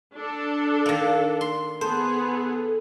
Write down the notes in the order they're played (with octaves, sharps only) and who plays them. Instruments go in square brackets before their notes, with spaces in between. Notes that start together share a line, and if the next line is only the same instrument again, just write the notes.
[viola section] D4 A4
[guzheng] D#3 A#3
C6
[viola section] B3 G#4 [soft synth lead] A4 [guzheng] C5